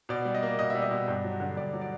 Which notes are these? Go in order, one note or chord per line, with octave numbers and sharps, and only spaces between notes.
B2 D5
G3
D#5
A#3
B2 D#5
G3 E5
D#5
B2
G2
F#3
D3
G2 D5
F#3
D5